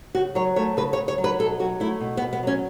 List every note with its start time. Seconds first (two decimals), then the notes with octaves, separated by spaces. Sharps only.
0.15 C#3 F#4
0.35 F#3 C#5
0.56 A3 C#5
0.77 C#3 B4
0.93 C#5
0.97 C#3
1.08 C#5
1.18 F#3
1.24 B4
1.39 B2 A4
1.59 F#3 F#4
1.80 A3 E4
2.01 B2
2.17 B3
2.22 B2
2.33 B3
2.43 F#3 C#4